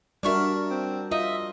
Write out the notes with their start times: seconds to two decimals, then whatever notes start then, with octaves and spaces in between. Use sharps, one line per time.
0.23 G3 D4 F#4 A#4 E5 C#6 F6
0.71 C4
1.11 F4 D#5 E5